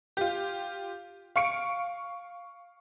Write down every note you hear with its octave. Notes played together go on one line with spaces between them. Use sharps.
F4 G4
F5 C#6 C#7 D7